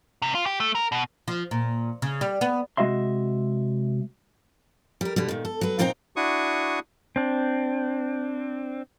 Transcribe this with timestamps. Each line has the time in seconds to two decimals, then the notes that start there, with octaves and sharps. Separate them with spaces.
0.22 C3
0.35 F4
0.46 G4
0.60 A3
0.75 A#4
0.92 B2
1.28 F3
1.51 A#2
2.02 C#3
2.21 G3
2.41 B3
2.77 C3 G#3 F#4 D#5 E5 C6
5.01 G3 A#4
5.16 B2 D3 G3
5.29 A#2 D#3
5.45 A4
5.61 F#3 B4
5.79 A#2 C4 D#4 C5 G5 A#5
6.16 D4 E4 F#4 C#6 D#6
7.16 C4 D4